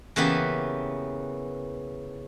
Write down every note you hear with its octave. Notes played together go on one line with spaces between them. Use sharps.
C#3 E3 A#3 B3 G4